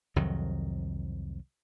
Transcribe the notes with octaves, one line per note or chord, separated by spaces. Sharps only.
C2 F2 D#3 F#3